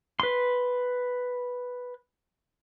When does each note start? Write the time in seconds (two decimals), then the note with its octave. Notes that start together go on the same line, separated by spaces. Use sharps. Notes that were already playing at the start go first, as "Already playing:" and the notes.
0.20 B4 C6